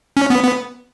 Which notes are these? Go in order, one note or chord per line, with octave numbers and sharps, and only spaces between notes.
C#4
B3
B3